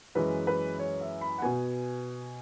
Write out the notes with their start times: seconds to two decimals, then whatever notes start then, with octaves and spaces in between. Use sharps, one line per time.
0.15 F#2 E3 G#3 B4
0.47 B4
0.79 C#5
1.01 E5
1.21 B5
1.39 F#5
1.42 B2 B3 G#5